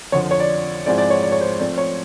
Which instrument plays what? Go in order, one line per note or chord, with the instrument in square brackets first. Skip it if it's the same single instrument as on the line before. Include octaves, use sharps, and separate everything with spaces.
[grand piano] F2 D3 F3 [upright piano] C#5
[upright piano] C#5
D5
[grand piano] G#2 F3 G#3 C4 E4 [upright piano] D5
[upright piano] D5
C#5
D5
C#5
C5
[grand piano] F3 A3 C4 [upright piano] D5
[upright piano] C#5